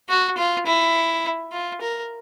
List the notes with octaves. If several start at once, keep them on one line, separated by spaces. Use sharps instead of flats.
F#4
F4
E4
F4
A#4